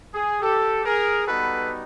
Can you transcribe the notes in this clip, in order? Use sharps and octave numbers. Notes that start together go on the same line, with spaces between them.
G#4
G4 A4
G#4 A#4
G3 B3 D#4 F#4 A4 B4